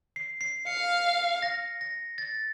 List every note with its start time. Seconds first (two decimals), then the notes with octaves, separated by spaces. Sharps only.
0.16 C7
0.41 C7
0.67 F5 C#7
1.42 A#6
1.81 A#6
2.18 A6